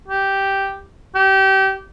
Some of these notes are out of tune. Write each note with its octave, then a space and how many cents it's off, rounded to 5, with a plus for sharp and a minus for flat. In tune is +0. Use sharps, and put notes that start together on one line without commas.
G4 -5
G4 -25